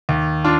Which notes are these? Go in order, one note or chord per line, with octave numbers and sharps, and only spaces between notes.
D#2
D4 F4